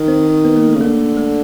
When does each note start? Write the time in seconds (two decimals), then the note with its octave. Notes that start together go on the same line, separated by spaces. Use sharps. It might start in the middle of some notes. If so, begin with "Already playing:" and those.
Already playing: D#3
0.08 C4
0.45 B3
0.56 A#3
0.68 A3
0.75 C#3
0.80 D3 A#3
1.17 A3